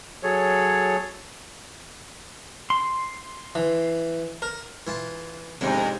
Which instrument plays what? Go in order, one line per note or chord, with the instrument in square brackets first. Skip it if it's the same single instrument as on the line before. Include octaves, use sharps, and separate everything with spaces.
[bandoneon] F#3 G#4 A4 C#5
[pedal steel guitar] C6
[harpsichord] E3
A#4
E3 F4 A5
[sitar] F2 [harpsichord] G#2 C3 D4